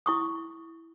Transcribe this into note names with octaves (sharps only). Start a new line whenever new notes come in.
E4 C#6 D#6